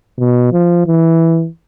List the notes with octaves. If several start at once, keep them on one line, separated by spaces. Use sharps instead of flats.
B2
F3
E3